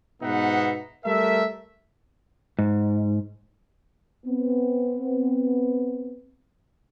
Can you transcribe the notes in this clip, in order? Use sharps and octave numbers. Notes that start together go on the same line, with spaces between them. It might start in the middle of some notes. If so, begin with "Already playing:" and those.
G#2 B2 B3 D#4 E5 F#5
G3 A3 A#4 E5
G#2
B3 C4